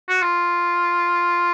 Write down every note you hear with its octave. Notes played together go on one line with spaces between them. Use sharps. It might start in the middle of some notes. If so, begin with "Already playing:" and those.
F#4
F4